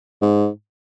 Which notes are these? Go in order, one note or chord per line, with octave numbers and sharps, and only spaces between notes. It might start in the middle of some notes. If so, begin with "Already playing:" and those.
G#2